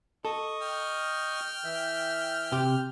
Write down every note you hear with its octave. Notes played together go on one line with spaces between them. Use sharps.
A4 D#5 C#6 D#6
G5 F6
E3 E5
C3 G4